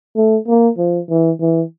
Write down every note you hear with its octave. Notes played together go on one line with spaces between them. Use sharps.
A3
A#3
F3
E3
E3